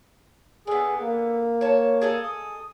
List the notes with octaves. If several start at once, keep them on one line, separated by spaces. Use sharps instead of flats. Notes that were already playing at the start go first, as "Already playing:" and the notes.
D3 B3 G#4
A#3
C#5 A5
G#4 A4 D#5
D#6